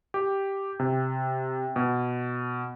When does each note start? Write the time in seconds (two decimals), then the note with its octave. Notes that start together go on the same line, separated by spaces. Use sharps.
0.14 G4
0.79 C3
1.76 B2